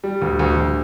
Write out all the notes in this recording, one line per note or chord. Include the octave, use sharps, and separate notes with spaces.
G3
D2
D2
D2